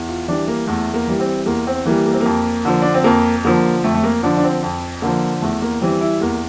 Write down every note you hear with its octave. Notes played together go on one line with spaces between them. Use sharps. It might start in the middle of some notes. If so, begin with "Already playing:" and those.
Already playing: E2
F4
E3 G3 D4
A#3
E2 A3
A#3
E3 G3
C4
E2 A#3
C4
E3 G3 A#3
A#3
C4
F2 A#3
D3 F3
D4
C4
F2 A#3
D3 F3 A#3
F2 A3
A3
A#3
D3 F3 D4
D4
C4
F2
D3 F3 A#3
E2 A3
A#3
E3 G3 C4
E4
E2 A#3